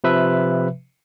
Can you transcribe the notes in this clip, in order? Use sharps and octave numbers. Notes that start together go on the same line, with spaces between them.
C3 F3 B4 E5